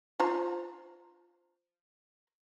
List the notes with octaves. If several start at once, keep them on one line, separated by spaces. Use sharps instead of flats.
F4 C5 A#5